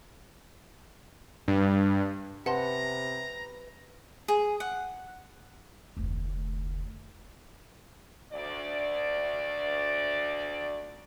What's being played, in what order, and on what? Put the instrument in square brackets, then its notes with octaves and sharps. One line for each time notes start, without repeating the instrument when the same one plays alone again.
[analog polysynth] G2
[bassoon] C3 [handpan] B4 [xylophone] F#5 A5 C6 [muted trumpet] A#5
[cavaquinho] G#4
F#5
[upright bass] F1 D2
[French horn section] D2 D5